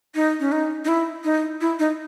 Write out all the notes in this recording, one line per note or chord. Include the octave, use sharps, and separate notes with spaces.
D#4
C#4
D#4
D#4
E4
D#4
E4
D#4